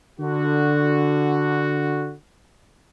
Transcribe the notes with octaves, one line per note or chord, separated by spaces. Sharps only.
D3 F#4